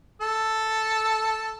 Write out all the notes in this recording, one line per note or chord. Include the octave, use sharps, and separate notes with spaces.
A4